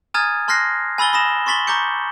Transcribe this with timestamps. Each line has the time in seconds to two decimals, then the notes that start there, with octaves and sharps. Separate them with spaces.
0.14 G#5 A#5 D#6 F6 G#6 A6
0.48 A5 C6 F6 F#6 A#6 C7
0.98 G#5 B5 E6 A6 G7
1.13 B5 D#6 A#6 E7
1.46 C6 C#6 A6 B6 F#7 G7
1.67 A#5 C#6 D6 G6 C#7